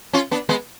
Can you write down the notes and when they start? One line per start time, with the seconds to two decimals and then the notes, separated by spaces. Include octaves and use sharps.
0.13 C#4 F4
0.31 B3 D4
0.49 G#3 B3